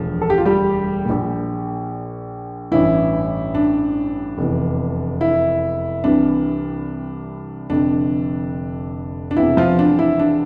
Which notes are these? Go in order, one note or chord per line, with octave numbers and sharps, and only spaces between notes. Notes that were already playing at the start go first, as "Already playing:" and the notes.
Already playing: E1 D2 D3 F3
A4
G4
F4
G3 G4
A#1 A#2
A1 G2 E3 E4
D4
F1 E2 E3
E4
C2 C3 E3 D4
F1 F2 D3 D4
D4
E1 E2 C3 E3 E4
F3 F4
D4
E4
D4